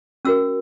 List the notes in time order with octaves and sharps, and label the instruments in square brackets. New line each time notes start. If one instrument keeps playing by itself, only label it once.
[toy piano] C#4 F#4 A#4 E6